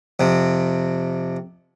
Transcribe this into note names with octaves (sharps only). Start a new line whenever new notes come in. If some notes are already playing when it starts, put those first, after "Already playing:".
F2 C3